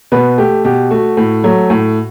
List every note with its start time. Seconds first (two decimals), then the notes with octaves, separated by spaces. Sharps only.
0.12 B2 B4
0.38 A3 G4
0.64 B2 G4
0.91 A3 F#4
1.17 A2
1.44 F#3 A3
1.70 A2